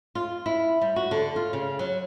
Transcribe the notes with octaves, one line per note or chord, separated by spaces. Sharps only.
F4
E4
G3
F#4
D3
F4
C#3
F#3